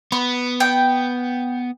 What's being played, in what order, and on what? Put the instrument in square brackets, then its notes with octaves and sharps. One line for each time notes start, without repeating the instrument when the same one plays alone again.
[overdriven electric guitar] B3 [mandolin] B5
[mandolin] G5